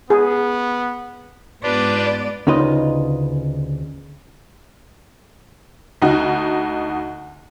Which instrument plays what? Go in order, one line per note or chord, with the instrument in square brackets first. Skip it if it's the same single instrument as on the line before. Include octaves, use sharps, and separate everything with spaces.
[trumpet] B3 [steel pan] G#4
[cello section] G#2 B3 [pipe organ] D4 F4 G4 [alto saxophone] B4 [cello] D5
[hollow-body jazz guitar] D2 C#3 D#4 F4 B4 D#5
[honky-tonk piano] D2 D#4 F#4